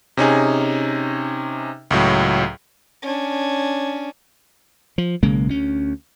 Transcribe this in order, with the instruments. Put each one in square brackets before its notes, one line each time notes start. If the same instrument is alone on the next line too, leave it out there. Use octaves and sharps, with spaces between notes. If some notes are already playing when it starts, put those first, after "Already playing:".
[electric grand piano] C3 C#4 D#4 G#4
C#2 A2 F#3
[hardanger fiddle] C#4 D4
[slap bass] F3
B1 C#3 G#3 A#3
D2 C#4